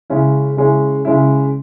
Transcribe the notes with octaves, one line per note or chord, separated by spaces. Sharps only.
C#3 G#3 C#4 E4
C#3 G#3 C#4 E4
C#3 G#3 C#4 E4